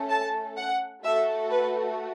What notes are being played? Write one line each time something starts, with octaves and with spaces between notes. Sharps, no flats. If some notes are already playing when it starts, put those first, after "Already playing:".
Already playing: A3 C#4 A4
A5
F#5
A3 F#4 A4 E5
B4